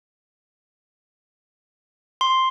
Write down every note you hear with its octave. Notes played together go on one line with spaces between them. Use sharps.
C6